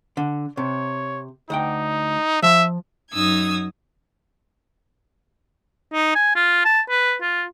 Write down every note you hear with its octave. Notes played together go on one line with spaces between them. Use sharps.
D3
C3 C#5
D2 D#4 F#5 G5
F3 E5
F#2 D#4 D#6 E6 G#6
D#4
G#5
F4
A5
B4
F4